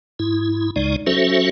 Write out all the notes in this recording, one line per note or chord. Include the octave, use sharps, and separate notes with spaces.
G#2 E4
C#2 C#3 G#3 D#4 D5
F#3 C#4 F#4 A4 C5 E5